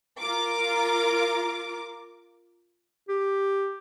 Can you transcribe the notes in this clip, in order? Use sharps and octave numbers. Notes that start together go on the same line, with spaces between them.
F4 A#4 D6
G4